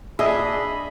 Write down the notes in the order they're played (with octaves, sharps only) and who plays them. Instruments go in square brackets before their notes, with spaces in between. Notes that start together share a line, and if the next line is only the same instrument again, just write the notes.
[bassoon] D4 [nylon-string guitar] G#4 [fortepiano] D#5 E5 [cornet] B5